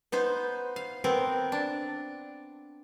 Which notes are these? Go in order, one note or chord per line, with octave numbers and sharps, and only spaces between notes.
B3 D#4 C5
F5
B3 C4 A#4
D4